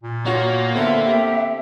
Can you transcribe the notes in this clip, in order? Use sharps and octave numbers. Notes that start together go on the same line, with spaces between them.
A#2
A#3 F4 F#4 C#5 C#6
D3 B3 C4 A4 E5
G4